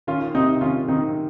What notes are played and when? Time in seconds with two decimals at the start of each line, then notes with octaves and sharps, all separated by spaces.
0.07 D#3 C#4 F4
0.34 C3 C4 D#4
0.61 D#3 C#4 F4
0.88 D#3 C4 D#4